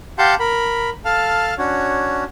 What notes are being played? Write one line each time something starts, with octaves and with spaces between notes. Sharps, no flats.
G4 F5 F#5 A5 C6 G6
A#4 B5
A4 F5 A5 F6
C#4 D4 F#4 C#5